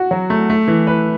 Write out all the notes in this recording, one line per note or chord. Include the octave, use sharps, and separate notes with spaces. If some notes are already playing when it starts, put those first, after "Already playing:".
Already playing: F#4
F#3
A3
A3
E3
B4